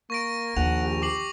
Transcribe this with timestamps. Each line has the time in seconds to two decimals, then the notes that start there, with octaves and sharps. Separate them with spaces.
0.10 A#3 C#6 A#6 D7
0.56 A#1 D#2 F#5 F7
0.83 G4
1.02 D6 C7 F#7